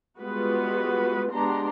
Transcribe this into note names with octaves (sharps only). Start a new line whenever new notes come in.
G3 G#3 B3 F4 F#4 B4
G#3 B3 D4 G4 A#5 C6